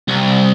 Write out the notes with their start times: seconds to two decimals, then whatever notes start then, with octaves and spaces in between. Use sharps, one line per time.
0.08 C2